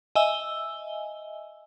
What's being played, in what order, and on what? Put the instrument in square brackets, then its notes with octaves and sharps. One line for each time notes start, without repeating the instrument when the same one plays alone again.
[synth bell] D#5 E5 G#5 E6 G7